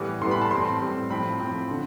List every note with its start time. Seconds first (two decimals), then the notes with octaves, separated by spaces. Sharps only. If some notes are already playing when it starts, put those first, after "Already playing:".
Already playing: A2 E3 G3 B3
0.21 A2 E3 G3 B3 C6
0.31 B5
0.42 A5
0.51 A2 G3 C4 C6
0.81 A2 G3 C4
1.10 A2 F3 C4 B5
1.40 A2 F3 C4
1.71 D3